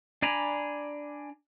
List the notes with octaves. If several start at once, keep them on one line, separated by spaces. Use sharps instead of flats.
D4 D5 G#5 A#5 B5